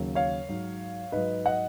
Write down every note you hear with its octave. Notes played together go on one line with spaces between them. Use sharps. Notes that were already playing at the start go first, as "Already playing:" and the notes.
Already playing: D#2 C#3 F#3
C#5 F5
G#2 F#3
G#2 F#3 B4 D#5
D#5 F#5